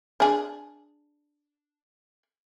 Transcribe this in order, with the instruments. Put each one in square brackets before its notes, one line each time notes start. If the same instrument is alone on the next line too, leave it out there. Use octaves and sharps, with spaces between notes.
[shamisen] D4 G#4